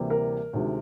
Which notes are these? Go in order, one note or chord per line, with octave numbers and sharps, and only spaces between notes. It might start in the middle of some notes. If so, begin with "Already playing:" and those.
Already playing: D2 C3 E3 G3 A#3
A#4
D2 C3 D#3 G#3